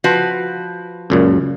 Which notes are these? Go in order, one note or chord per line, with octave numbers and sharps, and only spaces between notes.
F3 F#4 B4
C#2 F#2 A#2